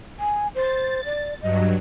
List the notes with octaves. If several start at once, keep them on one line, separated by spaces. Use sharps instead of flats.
G#5
C5 A6
D5
G2 F#3 D#5